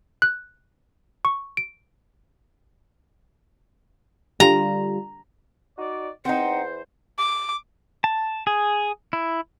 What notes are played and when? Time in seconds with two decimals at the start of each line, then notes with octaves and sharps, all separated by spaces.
0.22 F#6
1.25 C#6
1.57 D7
4.40 D3 G3 F4 A#5
5.77 D#4 F#4 D5
6.25 E2 C4 D#4 C5 F#5
7.18 D6
8.04 A5
8.47 G#4
9.13 E4